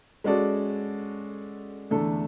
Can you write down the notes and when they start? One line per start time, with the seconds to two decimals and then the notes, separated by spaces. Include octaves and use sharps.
0.24 G#3 C#4 F#4 A4 D5
1.90 E2 D3 A3 D4 A4